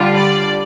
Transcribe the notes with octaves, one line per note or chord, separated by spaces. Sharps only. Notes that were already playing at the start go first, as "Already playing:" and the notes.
Already playing: D3 G3 D4 F4
D5